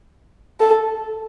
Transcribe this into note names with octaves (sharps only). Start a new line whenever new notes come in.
A4